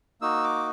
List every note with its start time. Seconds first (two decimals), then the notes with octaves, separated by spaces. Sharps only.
0.21 A#3 D#4 F#4 E6
0.44 D6